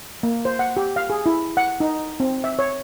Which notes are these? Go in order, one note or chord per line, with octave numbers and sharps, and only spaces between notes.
A#3
C5
F#5
G4
F5
G#4
E4
F#5
D#4
C4
E5
C#5